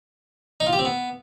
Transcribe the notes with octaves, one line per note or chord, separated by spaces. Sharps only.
D#4
F4
G4
C4
B3